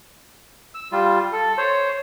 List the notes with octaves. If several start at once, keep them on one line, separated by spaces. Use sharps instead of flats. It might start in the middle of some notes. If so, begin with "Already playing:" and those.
E6
G3 F4
A4
C5 C#5